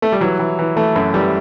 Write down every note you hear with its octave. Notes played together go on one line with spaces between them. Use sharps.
A3
G3
E3 F#3
E3
E3
E3 A3
F#2
E3 G3